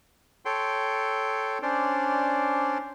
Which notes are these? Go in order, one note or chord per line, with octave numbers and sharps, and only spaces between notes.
A4 C#5 G5 C6
C#4 D4 C5 D5